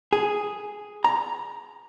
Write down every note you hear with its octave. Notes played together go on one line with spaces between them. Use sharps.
G#4
A#5